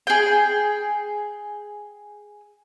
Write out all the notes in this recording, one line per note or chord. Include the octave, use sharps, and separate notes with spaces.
G#4 G5